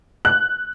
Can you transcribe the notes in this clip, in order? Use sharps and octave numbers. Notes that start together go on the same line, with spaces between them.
F#6